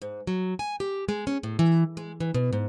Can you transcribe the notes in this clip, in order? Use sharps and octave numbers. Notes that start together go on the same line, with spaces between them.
G#2
F#3
G#5
G4
G#3
C#4
A2
E3
G#3
E3
B2
G#2